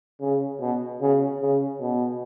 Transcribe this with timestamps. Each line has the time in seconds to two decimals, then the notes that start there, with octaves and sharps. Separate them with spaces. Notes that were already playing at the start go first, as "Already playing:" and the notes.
0.21 C#3
0.61 B2
1.01 C#3
1.41 C#3
1.81 B2